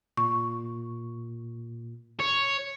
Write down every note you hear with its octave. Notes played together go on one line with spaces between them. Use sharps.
A#2 C#6
C#5